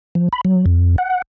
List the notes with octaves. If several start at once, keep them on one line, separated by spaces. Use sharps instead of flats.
F3
B5
F#3
F2
F#5